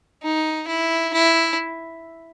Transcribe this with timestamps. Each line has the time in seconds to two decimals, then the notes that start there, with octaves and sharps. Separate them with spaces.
0.23 D#4
0.68 E4
1.14 E4